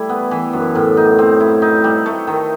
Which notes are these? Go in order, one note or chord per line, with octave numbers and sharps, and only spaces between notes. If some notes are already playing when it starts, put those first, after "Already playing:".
Already playing: G3 A3 E4
B3
E3
F#2
A2
D#4
C4
E4
D#4
G3
A3
D#3